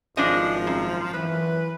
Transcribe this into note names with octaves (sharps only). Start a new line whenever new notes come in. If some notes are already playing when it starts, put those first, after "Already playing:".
G#1 F3 G#3 D4 D#5
F#2
E3 B4